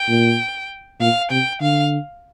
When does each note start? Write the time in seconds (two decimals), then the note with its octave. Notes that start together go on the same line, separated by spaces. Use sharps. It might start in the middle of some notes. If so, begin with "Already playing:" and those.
Already playing: G5
0.09 A#2
1.00 A#2 F5
1.31 C3 G5
1.61 D3 F5